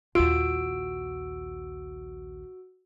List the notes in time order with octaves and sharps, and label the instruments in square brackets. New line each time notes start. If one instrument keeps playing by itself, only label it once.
[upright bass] A#1 D#2 [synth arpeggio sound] F4 [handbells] F#4 E6 D7